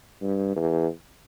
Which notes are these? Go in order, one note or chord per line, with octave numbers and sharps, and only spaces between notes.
G2
E2